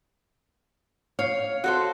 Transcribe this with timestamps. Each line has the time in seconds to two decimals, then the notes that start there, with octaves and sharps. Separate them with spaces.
1.19 C#5 F5
1.64 F#4 A4 C5